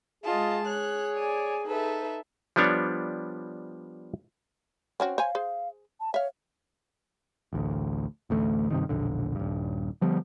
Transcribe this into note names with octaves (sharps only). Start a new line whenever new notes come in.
G#3 F4 G#4 D#5 A5
C#5 F#6
D5 G#5
D#4 A4 B4 E5
F3 G3 B3 D4 C#5
C4 C#4 F#4
C5 C#5 F5 G#5
G#4 C5
A5
C#5 E5 F5
A1 D2
A1 D2 A3
G2 C3 D#3
E1 A#1 D3
D#1 G2
D3 F3 G3 B3